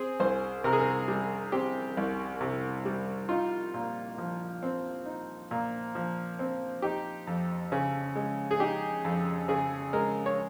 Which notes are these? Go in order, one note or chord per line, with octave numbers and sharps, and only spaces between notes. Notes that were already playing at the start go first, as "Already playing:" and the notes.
Already playing: C4 G#4
C2 C5
C3 A#4
G#4
A#4
G3
C4 G4
C2
C3
G3
D#4 F4
A#2
F3
C4
D#4
A#2
F3
C4
D#4 G4
F2
C#3
G#3
G#4
D#4 G4
F2
C#3 G#4
G#3 A#4
C#5